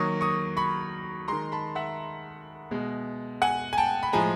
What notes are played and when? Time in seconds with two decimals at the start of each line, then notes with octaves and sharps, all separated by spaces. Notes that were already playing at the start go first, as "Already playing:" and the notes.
Already playing: D#3 F#3 A#3 C#6 D#6
0.21 C#6 D#6
0.57 B5 C#6
1.28 D#3 G#3 A#5 C6
1.52 A5 B5
1.75 E5 F#5
2.71 B2 G#3
3.42 F#5 G#5
3.73 G#5
3.78 G5 A5
4.03 B5
4.13 A2 F3 G#3 G#5 A#5